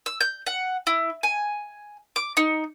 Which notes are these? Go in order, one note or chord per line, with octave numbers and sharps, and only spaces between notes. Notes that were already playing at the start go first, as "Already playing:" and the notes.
E6
G6
F#5
E4
G#5
D6
D#4